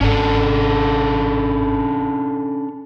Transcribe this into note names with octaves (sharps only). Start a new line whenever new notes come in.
G#1 G#2 C#4 D4 A4